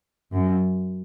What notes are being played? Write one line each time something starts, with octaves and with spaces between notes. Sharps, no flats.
F#2